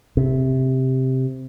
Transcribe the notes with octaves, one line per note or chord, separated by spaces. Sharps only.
C3